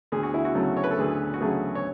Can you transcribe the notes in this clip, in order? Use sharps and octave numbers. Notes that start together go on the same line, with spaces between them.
D2 G#4
F#4
E4
F#4
C#3 F#3 A3
C#5
B4
A4
D2 G#4
F#4
C#3 F#3 A3 G#4
C#5